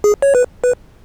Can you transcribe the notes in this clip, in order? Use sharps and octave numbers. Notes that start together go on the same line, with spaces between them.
G#4
C#5
B4
B4